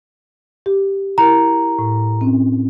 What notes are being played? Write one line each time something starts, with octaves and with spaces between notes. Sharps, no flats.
G4
E4 A#4 A#5
A2
C4 C#4